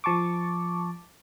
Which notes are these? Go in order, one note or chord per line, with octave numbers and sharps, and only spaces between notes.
F3 A5 C#6 D6